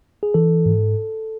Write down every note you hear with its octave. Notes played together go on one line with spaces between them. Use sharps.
G#4
E3 A4
G#2